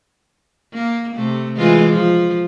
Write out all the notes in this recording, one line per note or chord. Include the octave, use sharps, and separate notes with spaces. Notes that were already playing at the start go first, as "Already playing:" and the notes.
A#3
C3 A3
E3 G#3 F4
F3